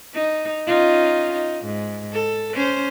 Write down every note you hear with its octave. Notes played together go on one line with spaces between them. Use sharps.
D#4
C#4 D#4 F4
D#4
G#2
A4
C#4 C5